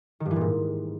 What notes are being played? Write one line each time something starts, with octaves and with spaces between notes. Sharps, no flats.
D#3
G2
E3
A#2
G#2